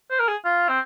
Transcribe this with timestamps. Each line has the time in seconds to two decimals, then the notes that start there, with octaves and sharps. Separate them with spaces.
0.11 C5
0.19 A#4
0.28 G#4
0.45 F4
0.69 C4